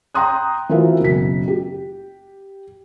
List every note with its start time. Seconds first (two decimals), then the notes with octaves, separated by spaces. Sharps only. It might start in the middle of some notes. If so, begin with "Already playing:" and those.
0.14 G5 A#5 C6 D#6 F#6
0.69 E3 C4 F4 F#4 A#4 E5
1.00 F#1 B1 B6
1.48 G4